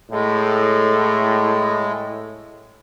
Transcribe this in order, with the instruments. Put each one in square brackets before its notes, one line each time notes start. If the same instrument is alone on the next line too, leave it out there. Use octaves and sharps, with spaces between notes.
[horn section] A2 [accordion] G#3